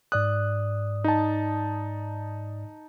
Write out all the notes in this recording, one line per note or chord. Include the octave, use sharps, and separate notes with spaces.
G#2 D5 D#6 F#6
D#4 A5